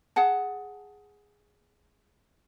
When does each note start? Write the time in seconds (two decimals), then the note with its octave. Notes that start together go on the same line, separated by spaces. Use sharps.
0.16 G#4 F#5 A5